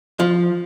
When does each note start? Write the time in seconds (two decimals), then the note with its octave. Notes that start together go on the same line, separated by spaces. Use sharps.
0.20 F3